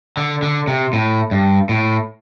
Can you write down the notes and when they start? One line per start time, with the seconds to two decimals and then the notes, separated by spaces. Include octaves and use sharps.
0.17 D3
0.42 D3
0.68 C3
0.93 A2
1.31 G2
1.69 A2